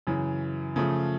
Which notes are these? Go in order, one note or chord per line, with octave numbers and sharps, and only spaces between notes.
F#2 C#3 E3
C#3 F3 A3